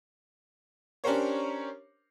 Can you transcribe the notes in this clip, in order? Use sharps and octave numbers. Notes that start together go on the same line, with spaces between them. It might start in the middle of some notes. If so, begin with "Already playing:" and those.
C#4 D4 G4 A#4 C5 C#5